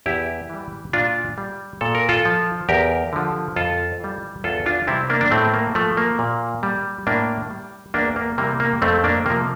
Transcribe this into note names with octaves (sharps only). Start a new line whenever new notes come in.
E2 E4 G4
E3 G3
A#2 D4 F4
G3
A#2 A4
A#4
F4 A4
F3
E2 G4 A#4
D3 F3
F2 F4 A4
E3 G3
E2 F4 A4
D4 F4
C3 E3 G3 C4 E4
A#3 D4
D4
A2 A3 C4
A#3
F3 A3
A#3
A#2
G3
A2 A#3 D4
G3
E2 A#3 D4
A#3
C3 E3 G3 A#3
A#3
F2 A3 C4
A#3 D4
C3 F3 A#3